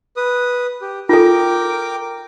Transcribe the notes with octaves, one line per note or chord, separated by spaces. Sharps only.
B4 D#6
G4
F4 A4 A#4 G5 D6